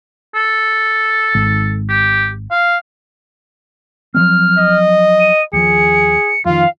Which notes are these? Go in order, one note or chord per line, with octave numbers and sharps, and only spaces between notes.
A4
G#1
G4
F5
F3 F#3 C4 F6
D#5
D#7
D#2 F3 G#4 C#7
F2 D#3 F4 F5